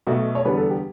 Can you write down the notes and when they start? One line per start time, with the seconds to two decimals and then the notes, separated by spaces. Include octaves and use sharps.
0.07 B1 B2 A3 F#4
0.35 C#5
0.45 E2 D3 G3 B3 B4
0.57 A4
0.70 G4